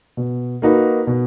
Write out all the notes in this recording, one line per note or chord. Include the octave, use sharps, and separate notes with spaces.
B2
A#3 D#4 F#4 B4
B2